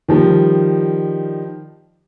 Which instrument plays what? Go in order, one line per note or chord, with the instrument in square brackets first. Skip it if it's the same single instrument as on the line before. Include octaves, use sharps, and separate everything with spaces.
[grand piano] D#3 F3 G3